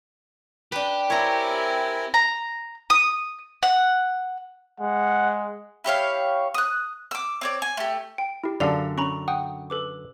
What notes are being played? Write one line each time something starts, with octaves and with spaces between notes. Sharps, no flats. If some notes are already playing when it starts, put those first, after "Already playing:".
D4 G4 B4
C4 E4 A#4 C#5 G#5 A#5
A#5
D#6
F#5
G#3 F#5
E4 G4 C#5 F5
D#6 F#6
D6 E6
C4 C#5 D5
G#5
A3 G4
G5
E4 G4
F#2 D3 D5 F5 A5 F7
C#4 A#5 B5 C#6
F#5 G5 D#6
A4 B4 D6